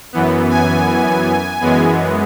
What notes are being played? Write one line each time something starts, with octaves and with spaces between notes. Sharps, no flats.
F#2 E3 B3
G#5
F#2 E3 G#3 B3